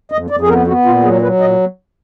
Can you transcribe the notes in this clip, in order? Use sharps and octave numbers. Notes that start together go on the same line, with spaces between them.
F2 D#5
F2 D5
G#4
B3 A#4
B3 F#4
A#2 F4
F#3 G#4
F#3 B4
A#2 D#5